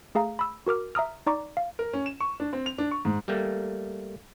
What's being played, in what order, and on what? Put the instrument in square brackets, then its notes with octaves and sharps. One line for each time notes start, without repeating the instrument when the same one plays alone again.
[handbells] A3 G#4 F5 A#5
B5 E6
F#4 A#4 D6 F6
E5 A#5 D#6 F6
D#4 D5 A#5 C#6 D6
F5
[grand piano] A#4
C#4
E7
C#6
D4
C4
F7
D4
C#6
G#2
[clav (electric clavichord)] G3 A3 A#3